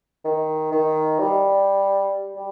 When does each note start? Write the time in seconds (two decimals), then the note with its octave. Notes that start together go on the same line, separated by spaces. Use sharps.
0.25 D#3
0.72 D#3
1.19 G3
2.35 G3